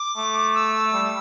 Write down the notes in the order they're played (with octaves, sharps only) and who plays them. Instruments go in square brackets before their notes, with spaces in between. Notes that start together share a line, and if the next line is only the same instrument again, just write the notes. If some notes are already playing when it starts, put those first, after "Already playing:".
Already playing: [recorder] D6
[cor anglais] A3
[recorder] E6
[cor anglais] G3